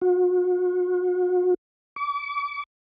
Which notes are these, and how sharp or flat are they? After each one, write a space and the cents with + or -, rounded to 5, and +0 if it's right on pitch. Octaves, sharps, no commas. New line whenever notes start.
F#4 -40
D6 -40